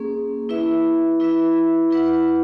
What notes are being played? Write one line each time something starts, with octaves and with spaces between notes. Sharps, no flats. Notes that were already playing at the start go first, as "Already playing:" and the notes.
Already playing: A#3 C#4 G#4
E4 B4 E5
E4 B4 E5
E4 B4 F#5